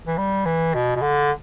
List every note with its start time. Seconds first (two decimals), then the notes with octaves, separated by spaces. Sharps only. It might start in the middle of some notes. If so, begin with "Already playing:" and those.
0.07 E3
0.17 G3
0.45 E3
0.74 B2
0.96 B2
1.02 D3